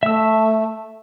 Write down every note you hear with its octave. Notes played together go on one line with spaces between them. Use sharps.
A3 E5 E6